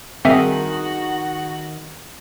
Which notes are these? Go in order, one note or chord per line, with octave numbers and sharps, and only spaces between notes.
D#3 C4 F#4 G#4 E5 F#5